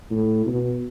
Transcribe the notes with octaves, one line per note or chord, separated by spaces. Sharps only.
A2
B2